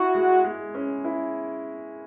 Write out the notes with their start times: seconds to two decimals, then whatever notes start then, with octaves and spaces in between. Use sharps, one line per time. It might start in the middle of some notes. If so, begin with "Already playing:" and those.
Already playing: E4 F#4
0.15 G#3
0.44 G#3
0.74 C#4
1.04 E4